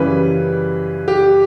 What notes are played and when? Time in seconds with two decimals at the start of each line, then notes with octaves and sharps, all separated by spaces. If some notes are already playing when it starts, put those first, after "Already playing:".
Already playing: F#2 C#3 E3 G3 B4
1.08 G4